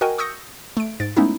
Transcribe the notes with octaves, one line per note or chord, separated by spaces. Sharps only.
F#4 A#4 D#5 G5 G#5
C#6 D#6 E6 G6 A#6 C#7
A3 D7
G#2 A6 D7
G#3 A3 B3 C#4 D#4 E4